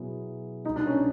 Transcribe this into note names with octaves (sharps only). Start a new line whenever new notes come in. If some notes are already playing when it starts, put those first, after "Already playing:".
Already playing: B2 F#3 B3 E4 G#4
C2 B2 G3 D#4
D4
C#4